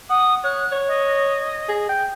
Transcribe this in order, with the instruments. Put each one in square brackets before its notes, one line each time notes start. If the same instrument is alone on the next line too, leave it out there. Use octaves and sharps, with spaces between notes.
[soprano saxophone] F#5 [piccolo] D#6
[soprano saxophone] C#5 [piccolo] F#6
[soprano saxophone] C#5
[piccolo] D#5
[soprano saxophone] G#4
G5